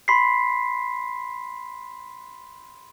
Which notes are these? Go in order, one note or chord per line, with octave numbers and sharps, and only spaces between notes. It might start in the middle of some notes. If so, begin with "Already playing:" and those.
B5 C6 B6 C7